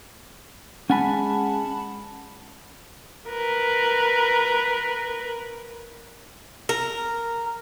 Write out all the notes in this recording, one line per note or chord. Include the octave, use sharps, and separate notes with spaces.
G#3 C#4 F#5 G#5 A5 B5
A#4 B4
A#4